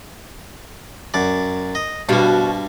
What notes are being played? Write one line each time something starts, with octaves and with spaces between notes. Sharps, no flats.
F#2 D5
D#5
G2 B2 F3 G3 F#4